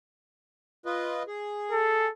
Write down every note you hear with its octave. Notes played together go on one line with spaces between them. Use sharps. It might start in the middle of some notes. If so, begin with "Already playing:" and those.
F4 B4 D#5
G#4
A4